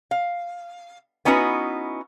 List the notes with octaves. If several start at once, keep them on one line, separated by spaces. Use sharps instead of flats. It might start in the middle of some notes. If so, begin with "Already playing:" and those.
F5
B3 C#4 D#4 E4 F#4 B4